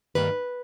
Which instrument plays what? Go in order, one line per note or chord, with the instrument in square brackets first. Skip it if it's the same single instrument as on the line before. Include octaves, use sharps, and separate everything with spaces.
[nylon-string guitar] G2 D#3 G3 A#3 B4